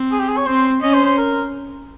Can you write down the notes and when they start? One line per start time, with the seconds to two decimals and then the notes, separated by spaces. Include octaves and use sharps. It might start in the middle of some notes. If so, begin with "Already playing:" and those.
Already playing: C4
0.12 G#4
0.19 G4
0.28 G#4
0.37 C#5
0.46 C4 C5
0.82 C#4 D#5
0.93 C5
1.05 C5
1.17 A#4